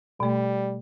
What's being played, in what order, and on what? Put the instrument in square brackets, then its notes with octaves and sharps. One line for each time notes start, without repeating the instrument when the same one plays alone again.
[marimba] B2 A3 [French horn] G3